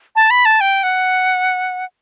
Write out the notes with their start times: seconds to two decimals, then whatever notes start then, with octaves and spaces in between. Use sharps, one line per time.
0.16 A5
0.30 B5
0.45 A5
0.61 G5
0.83 F#5